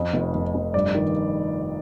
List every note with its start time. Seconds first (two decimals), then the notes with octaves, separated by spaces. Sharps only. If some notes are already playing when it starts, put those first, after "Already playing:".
Already playing: F2
0.13 F1
0.35 F1
0.54 F2
0.74 G2 D5
0.95 D#3